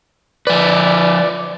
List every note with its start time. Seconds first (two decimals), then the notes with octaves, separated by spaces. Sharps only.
0.47 F3 B4 D5